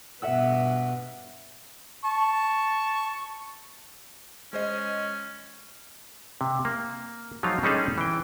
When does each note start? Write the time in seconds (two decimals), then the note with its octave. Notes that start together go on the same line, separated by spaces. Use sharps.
0.22 G2 B2 B4 E5 F#5 E6
2.05 A5 C#6
4.53 G#3 C#4 C5 D#5
6.41 C3
6.65 A#3
7.43 F3 F#3 G#3 D#4 F4 F5
7.63 G3 G#3 C#4 D#4 G#4 A4
7.98 E3 G5